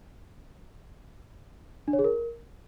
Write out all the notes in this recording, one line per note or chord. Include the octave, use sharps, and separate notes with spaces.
D4
C#5
G#4
A#4